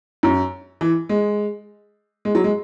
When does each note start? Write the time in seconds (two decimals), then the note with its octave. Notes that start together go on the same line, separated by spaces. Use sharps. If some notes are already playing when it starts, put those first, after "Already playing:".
0.23 F#2
0.81 E3
1.09 G#3
2.25 G#3
2.35 F#3
2.44 G#3